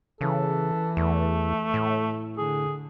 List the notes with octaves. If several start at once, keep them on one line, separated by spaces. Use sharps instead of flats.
C#3 E3 A4
E2 A3
A2
D3 G#4